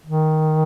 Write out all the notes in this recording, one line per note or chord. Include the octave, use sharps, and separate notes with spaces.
D#3